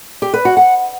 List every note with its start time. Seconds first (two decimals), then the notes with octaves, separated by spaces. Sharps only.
0.22 G4
0.34 B4
0.45 F#4
0.57 F#5